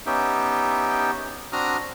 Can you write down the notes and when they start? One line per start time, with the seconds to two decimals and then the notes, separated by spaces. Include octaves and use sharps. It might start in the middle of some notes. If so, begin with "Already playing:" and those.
0.06 B3 C#4 D#4 G4 E5 G5
1.52 C4 D4 F#4 A#5 D#6 F6